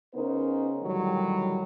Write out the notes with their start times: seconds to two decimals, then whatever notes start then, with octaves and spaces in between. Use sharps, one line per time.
0.14 C#3 B3 C#4 D#4 A#4 C5
0.82 A2 D3 D#3 F#3 G3